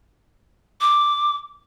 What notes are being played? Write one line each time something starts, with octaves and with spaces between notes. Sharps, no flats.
D6